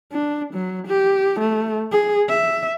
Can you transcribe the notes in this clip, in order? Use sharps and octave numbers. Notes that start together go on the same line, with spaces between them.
D4
F#3
G4
A3
G#4
E5